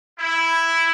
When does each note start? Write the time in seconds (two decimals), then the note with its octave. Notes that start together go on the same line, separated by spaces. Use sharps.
0.19 E4